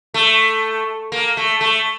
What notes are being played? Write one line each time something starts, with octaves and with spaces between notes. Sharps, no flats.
A3
A#3
A3
A3